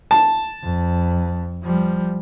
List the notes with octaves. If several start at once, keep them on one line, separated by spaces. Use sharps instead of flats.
A5
F2
F3 G3